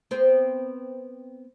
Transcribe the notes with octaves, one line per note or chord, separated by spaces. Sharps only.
B3 C4 C5